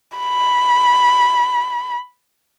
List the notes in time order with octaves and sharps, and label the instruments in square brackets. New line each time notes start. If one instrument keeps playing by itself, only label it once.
[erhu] B5